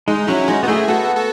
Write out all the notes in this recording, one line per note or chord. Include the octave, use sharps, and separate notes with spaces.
G#3 D#4
F#3 C#4 E4
G#3 D#4 F#4
B3 F#4
A3 E4 G#4
B3 F#4 A4
F#4 A4